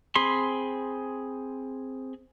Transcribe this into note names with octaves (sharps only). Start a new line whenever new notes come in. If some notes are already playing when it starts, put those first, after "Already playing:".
C4 G#4 B5 C6